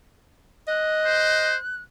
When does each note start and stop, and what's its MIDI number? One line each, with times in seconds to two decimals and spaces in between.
0.68 1.53 75
0.68 1.81 90
1.06 1.57 72